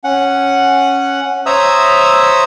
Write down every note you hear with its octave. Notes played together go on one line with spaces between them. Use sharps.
C#4 F#5
C5 C#5 E5 A#5 D#6 E6